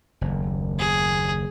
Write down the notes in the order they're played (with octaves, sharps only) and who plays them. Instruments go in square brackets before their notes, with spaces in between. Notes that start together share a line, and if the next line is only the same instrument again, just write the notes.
[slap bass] F#1 D#2
[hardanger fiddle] G#4